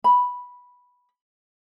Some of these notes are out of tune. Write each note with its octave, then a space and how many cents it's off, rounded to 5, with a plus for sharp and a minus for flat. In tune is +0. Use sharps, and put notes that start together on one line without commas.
B5 -5